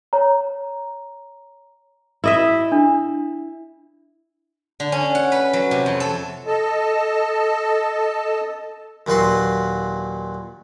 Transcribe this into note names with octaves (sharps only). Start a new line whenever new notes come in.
C#5 A#5
E4 D#5 E5
D4
D3
C#4
F#5
B4
F#3
C3
F2
A4
A4 D#5 A5
D#2 A#2 F#3 B4 C6